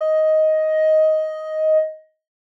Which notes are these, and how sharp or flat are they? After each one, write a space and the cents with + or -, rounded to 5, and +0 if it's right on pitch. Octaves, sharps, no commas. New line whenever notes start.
D#5 +10